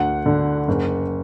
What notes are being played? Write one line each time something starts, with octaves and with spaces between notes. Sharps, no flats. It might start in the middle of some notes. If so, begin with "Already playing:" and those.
Already playing: D2 F#5
D3
F#1